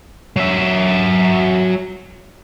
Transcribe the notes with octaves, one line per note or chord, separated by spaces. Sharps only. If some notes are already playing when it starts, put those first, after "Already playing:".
F#3 E5